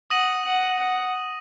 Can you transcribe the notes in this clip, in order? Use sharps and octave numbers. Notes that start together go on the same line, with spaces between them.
F#5 D#6 A#6 D#7 F#7
F#5
F#5